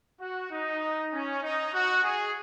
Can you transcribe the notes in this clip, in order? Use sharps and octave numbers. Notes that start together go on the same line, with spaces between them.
F#4
D#4
C#4
D#4
F#4
G#4